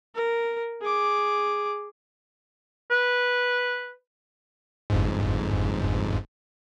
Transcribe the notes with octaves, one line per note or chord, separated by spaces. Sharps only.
A#4
G#4 D6
B4
G1 F2 G#2